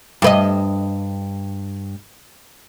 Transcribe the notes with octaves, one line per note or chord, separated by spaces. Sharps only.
G2 B4 D#5